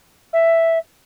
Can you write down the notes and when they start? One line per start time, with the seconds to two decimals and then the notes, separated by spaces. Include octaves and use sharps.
0.33 E5